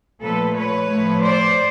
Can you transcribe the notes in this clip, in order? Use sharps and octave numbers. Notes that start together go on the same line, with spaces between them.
A#2 F3 A3 A4 B4
B4 C#5
A2 F3 A3
C5 D5